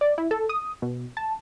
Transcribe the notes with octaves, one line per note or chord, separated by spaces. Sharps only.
D5
E4
A4
D#6
B2
A5